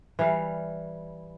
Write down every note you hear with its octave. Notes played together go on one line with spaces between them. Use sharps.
E3 G3 F5